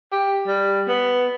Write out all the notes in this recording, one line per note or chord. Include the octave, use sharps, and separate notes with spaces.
G4
G3
B3